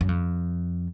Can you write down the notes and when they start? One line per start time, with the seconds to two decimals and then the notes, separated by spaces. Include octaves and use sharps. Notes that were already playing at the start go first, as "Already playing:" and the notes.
0.01 F#2
0.09 F2